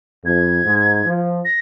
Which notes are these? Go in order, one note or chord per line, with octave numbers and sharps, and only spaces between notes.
F2 G#6
G#2
F3
A#6